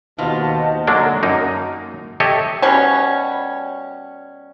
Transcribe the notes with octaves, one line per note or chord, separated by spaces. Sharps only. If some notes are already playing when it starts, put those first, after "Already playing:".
D#2 B2 F4 C5 D#5 F#5 A5
D3 F#3 G#3 A#3 D4
F#2 A#3 D#4
G4 A4 C#5 D#5 E5
B2 G3 C#4